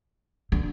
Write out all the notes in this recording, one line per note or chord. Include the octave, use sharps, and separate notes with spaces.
D3